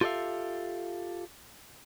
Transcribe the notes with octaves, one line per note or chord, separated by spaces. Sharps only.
F4 G4 A4 D5 E5 F5